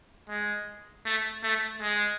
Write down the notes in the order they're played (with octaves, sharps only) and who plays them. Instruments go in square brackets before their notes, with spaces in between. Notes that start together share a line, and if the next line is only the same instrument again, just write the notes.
[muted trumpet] G#3
A3
A3
G#3